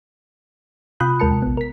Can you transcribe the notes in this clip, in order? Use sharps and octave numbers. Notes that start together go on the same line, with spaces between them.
C3 F4 B5 D#6 F#6 G6
D#2 G#3 A#4 A5 C#7
C3
A#1 B3
A#4 B6